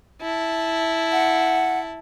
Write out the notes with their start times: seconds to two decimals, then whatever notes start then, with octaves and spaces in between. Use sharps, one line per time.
0.21 E4 A5
1.12 F#5